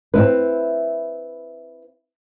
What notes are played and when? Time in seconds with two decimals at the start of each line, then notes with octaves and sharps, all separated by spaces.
0.14 C4 E4 B4